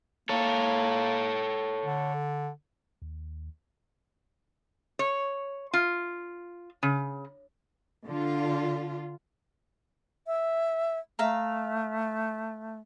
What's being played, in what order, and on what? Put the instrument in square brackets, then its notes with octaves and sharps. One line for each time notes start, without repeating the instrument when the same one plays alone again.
[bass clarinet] A#3 [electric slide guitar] A4 C#5
[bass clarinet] D3
[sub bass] D#2
[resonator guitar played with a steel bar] C#5
F4
C#3
[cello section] D3 F4
[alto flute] E5
[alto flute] A3 [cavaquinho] E5 F5 A#5